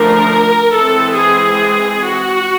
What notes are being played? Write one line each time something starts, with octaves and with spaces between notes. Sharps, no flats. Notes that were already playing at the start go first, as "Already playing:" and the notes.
Already playing: D3 F3 A3 D4 A#4
E3 G#3 C4 A4
G#4
F#4